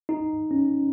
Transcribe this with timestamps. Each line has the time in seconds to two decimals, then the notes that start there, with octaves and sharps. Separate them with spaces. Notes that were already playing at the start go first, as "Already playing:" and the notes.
0.09 D#4
0.51 C#4